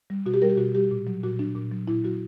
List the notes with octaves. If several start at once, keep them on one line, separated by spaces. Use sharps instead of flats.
G3
B2 F#4
G4
G3 A#4
G4
B2 F#4
G3 G4
A#2
F#3
A#2 F#4
F#3 D4
A#2
F#3
A#2 E4
F#3 F#4